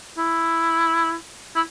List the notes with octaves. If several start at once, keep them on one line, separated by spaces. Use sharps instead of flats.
E4
E4